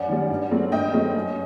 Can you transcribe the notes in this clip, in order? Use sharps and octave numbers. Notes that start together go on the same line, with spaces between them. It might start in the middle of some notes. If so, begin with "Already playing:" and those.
Already playing: F#2 D5 F#5
D#3 G3
G2
F#3 A3 C4
G2 D#5 G5
F#3 A3 C4
F#2